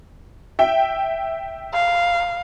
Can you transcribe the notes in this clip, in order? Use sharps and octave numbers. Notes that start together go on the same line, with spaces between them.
E5 G5
F5